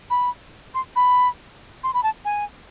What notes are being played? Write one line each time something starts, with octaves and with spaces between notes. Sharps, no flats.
B5
C6
B5
C6
B5
A5
G#5